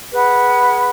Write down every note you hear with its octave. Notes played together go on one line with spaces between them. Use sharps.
G#4 B4 F#5 B5